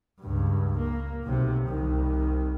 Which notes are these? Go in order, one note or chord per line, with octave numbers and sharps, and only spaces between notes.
C#2 G2
A#3
B1 C3
C2 D#3